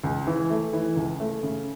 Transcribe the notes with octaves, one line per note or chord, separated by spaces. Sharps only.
C#2
E3
A3
E3
C#2
A3
C#3